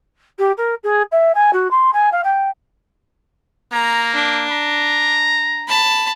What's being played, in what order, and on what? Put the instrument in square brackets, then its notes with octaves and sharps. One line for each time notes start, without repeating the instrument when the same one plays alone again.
[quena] G4
A#4
G#4
E5
G#5
F#4
C6
G#5
F5
G5
[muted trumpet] A#3 [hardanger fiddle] A#5
[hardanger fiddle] D4
[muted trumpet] A#5
[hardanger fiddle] A5 B5